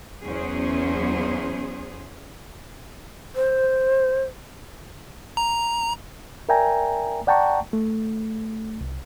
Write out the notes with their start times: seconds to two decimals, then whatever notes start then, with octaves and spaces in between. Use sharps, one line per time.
0.22 E2 F#3 C#4 G#4 C5
3.36 C5
5.37 A#5
6.49 A#4 D5 E5 G5 G#5 A#5
7.27 D5 F#5 G5 A5 A#5 C#6
7.73 A3
8.81 C2